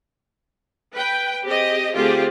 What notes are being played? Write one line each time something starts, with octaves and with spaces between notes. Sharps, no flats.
B4 G5
C4 G4 G#4 D#5
D3 A3 C4 F4 G4 G#4